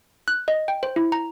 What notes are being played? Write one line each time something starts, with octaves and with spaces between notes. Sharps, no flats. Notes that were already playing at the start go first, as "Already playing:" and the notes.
F#6
D#5
G5
C5
E4
A#5